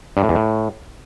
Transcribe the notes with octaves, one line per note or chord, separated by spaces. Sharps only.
G2
A2
E2
A2